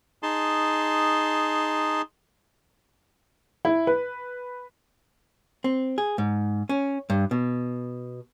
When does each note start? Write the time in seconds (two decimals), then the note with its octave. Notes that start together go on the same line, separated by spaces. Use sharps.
0.23 D#4 G#4 A5 C6
3.65 E4
3.87 B4
5.64 C4
5.98 G#4
6.18 G#2
6.69 C#4
7.10 G2
7.31 B2